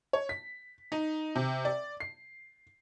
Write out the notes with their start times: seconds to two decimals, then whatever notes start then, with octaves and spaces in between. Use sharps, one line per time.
0.13 C#5
0.29 B6
0.92 D#4
1.35 C3
1.65 D5
2.00 C7